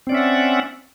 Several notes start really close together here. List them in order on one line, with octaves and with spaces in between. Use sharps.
C4 D5 C#4 E5 F#5